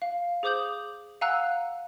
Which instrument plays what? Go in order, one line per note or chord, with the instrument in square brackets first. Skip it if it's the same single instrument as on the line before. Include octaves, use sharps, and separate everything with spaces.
[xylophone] F5
G#4 C5 D6 D#6 G6 F#7
F5 F#5 G#5 A#5 E6 F#6